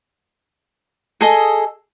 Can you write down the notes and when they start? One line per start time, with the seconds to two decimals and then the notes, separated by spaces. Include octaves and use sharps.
1.21 G#4 A4 D#5